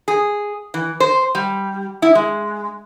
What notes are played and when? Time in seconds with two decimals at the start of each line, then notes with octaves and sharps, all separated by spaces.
0.08 G#4
0.74 E3
1.00 C5
1.35 G3
2.02 E4
2.15 G#3